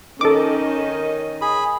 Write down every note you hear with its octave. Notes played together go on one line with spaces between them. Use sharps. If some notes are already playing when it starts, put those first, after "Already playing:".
D#3 C#4 A4 D#5 D6
G#4 B5